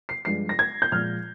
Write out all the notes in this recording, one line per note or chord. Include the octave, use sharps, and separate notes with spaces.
C7
G2 F3 G#3 C7
A#6
G#6
G6
A#2 F3 G#3 F6